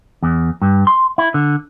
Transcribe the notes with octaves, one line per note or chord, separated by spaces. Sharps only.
E2
G2
C6
E4
D3